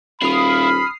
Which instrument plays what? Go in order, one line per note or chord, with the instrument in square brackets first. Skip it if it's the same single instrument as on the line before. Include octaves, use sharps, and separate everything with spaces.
[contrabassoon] D#1 [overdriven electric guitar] E4 F5 [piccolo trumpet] B5 [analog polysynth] D#6 F6 C7